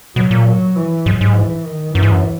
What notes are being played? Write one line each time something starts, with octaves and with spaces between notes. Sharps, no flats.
B2 F#3
A#2
F#3
E3
G#2 F#3
G#2
E3
D#3
F#2 E3
G#2
F#2